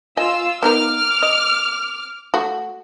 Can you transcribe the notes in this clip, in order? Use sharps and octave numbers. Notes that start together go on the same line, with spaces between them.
F4 D#5 G#5 E6
B3 D#4 A#4 D6 F6
D#5
A3 F#4